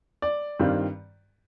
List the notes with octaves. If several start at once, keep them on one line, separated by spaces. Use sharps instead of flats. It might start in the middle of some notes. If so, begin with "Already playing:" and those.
D5
G2 D#3 G3 C4 F4